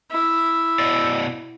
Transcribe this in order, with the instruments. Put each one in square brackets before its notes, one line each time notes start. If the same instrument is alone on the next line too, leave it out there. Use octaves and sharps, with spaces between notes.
[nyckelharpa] E4
[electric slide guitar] B2 D5 D#5